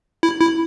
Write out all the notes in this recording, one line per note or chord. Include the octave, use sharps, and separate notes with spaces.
E4
E4